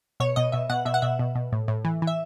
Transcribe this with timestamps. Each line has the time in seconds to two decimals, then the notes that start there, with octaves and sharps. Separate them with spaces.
0.20 B2 C#5
0.36 B2 D#5
0.52 B2 E5
0.70 B2 F#5
0.85 B2 E5
0.94 F#5
1.02 B2 E5
1.19 B2
1.35 B2
1.52 A2
1.68 A2
1.85 E3
2.02 E3
2.07 E5